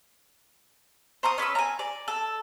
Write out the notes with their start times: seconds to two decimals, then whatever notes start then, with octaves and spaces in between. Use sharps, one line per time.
1.23 C5 A#5 C#6 D#6
1.38 C#4 B4 D6 E6
1.55 G#5 A#5
1.79 D5
2.08 A4